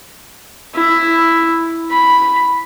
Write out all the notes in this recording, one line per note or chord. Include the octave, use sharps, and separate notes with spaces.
E4
B5